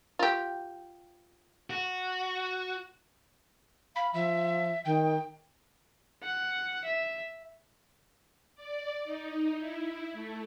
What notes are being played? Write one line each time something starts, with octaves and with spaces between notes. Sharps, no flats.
F4 G4
F#4
F5 B5
F3 E5
D#3 G5
F#5
E5
D5
D#4
E4
A3